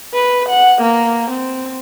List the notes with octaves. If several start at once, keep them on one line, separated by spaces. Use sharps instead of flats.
B4
F#5
A#3
C4